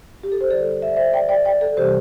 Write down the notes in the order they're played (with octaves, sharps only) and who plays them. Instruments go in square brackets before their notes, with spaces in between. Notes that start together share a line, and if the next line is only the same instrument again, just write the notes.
[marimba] G4
A4
C5
D3 G3 E4 A4 D5
E5
D5
C5 E5
D5 G5
D5 G5
D5 G5
A4
C3 E3 G3 G4 C5